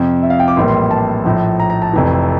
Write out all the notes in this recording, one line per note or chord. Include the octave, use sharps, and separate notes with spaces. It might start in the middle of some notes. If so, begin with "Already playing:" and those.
Already playing: F2 C3 F3
E5
F5
G5
D6
A#1 A2 E3 G3 A#3 C6
C6
A5
A#1 A2 F3
A#5
A#5
A5
F1 F2 E3